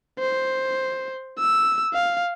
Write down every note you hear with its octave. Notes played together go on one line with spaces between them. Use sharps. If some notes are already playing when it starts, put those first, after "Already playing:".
C5
E6
F5